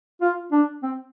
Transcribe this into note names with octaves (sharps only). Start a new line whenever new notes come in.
F4
D4
C4